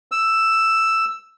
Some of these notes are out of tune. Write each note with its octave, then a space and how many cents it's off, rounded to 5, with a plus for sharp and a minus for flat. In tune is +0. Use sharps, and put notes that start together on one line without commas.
E6 +5